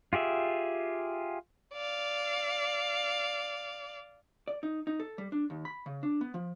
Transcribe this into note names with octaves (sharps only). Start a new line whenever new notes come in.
F4 G4 G#4 E5
D5 F5
D5
D#4
D#4
A4
G3
D4
D#2
B5
C#3
D4
B3
F3